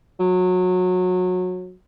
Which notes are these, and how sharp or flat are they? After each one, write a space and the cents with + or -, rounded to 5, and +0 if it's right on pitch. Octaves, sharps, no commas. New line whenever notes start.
F#3 -25